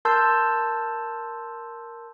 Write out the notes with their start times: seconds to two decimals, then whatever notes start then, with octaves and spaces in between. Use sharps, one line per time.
0.05 A#4 A5 C6 E6 G6